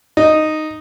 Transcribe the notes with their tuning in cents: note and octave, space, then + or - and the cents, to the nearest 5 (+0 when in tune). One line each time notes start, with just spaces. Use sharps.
D#4 -5